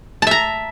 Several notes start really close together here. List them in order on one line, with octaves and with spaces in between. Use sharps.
A5 E5 A#5